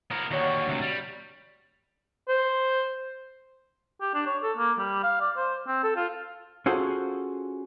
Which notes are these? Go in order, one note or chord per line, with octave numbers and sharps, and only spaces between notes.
D#3 F3 A#3 B3 A#4
D#2 D3 F#4 C#5 F#5
D2 C3
G3
C5
G4
D4
C#5
A4
A#3
G3
F5
D5
C5
C4
A4
F4
C#4 F4 F#4 G#4 A4 C5